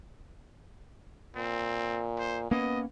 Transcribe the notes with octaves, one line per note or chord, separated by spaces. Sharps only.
A#2 C4
C5
A#3 B3 C#4 D#5